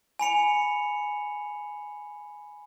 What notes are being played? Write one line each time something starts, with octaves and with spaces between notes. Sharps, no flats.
G#5 B5 C#7 F7